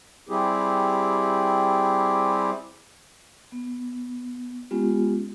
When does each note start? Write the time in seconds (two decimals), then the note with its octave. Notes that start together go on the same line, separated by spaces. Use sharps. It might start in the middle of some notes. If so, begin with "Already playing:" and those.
0.29 G3 C4 E4 G4 G#4
3.52 B3
4.71 G#3 B3 C#4 F4 G4